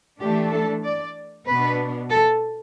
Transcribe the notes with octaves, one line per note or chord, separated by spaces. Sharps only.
E3 A3 D4 G4
A4
D5
B2 B3 D4 B4
A4